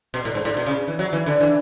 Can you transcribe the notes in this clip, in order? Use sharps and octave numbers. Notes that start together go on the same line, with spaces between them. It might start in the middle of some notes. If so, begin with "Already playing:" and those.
B2
A2
G#2
A2
B2
C#3
E3
F#3
E3
D3
E3